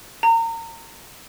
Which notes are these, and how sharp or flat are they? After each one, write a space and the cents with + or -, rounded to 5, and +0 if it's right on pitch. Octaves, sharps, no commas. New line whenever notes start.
A#5 -30